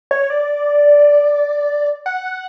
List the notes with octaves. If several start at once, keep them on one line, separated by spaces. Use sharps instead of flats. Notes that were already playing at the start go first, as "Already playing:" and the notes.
C#5
D5
F#5